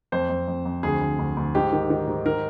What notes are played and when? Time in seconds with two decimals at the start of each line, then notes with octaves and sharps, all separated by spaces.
0.12 F2 C5
0.29 F2
0.48 F2
0.65 F2
0.83 D2 G#4
1.01 D2
1.19 D2
1.37 D2
1.55 G#2 G4
1.73 D#3
1.90 D#3
2.08 G#2
2.26 D#3 A#4